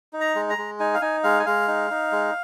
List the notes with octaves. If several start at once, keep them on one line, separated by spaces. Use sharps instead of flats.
D#4
A#5
G#3
A#5
G#3
D#4 G#5
F5
D#4 G#5
G#3 F5
G#5
G#3 F5
D#4
D#4
G#3